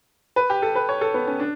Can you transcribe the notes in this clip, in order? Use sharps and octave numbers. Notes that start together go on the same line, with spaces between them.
B4
G4
A4
B4
C#5
A4
B3
C#4
D4